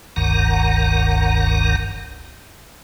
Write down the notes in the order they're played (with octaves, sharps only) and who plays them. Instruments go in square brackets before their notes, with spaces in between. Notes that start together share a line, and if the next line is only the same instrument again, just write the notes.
[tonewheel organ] F#1 C#2 G2 D#3 F#5 A#5